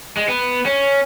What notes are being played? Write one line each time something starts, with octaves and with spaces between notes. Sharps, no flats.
G#3
B3
C#4